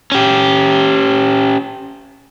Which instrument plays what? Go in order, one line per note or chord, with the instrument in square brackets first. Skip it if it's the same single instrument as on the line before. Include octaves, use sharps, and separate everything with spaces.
[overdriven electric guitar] C#4 G4